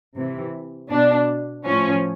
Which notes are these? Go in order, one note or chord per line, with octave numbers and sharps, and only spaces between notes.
C3 E3
B2 D4
A2 F3 C#4